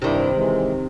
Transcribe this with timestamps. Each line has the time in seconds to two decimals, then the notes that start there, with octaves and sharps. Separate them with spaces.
0.02 G2 C3 D#3 D4 E4
0.35 E3 G#3